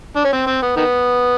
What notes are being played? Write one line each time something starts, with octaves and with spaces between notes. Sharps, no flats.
D4
C#4
C4
C4
B3
D#3 B3